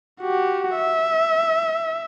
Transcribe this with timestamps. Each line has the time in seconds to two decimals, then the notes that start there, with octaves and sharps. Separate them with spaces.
0.21 F#4 G4
0.76 E5